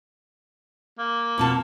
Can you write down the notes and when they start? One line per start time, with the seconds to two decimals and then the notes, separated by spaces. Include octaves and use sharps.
0.99 A#3
1.38 F2 B2 A5